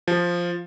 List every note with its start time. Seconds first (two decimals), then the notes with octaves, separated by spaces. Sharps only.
0.08 F3